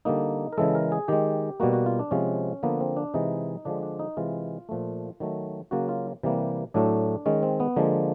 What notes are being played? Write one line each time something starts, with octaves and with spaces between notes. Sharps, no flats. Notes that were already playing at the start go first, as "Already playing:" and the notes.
D3 G3 A#3 D#4
A#4
C#3 E3 G#3 A4
A#4
G#4
D#3 G#3 G4
B2 G3 A#3 F#4
F#4
F4
D4
C3 F3 G#3 C#4
D3 F3 A#3 B3
C4
D4
C3 E3 G#3 D#4
D3 F3 G#3 D4
D4
D#4
C3 E3 G#3 F4
A#2 F3 A3
D#3 F#3 A3
C#3 F#3 A#3 F#4
F4
C3 E3 G3 A#3
A2 F#3 A3 D4
D#3 G#3 C#4
C4
B3
D3 F3 G#3 A#3